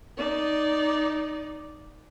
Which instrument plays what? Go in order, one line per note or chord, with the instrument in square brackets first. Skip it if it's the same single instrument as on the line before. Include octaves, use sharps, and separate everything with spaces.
[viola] D#4 D5